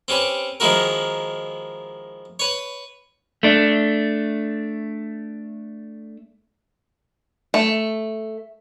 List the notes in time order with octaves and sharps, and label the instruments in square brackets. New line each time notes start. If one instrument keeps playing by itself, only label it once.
[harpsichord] C4 C#4 G4 B4
D#3 F3 G#3 E4 F#4 A#4
B4 C#5
[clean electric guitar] A3 D4
[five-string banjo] A3